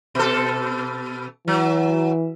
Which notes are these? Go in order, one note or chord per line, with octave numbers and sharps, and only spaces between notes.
B2 A4
E3 F#3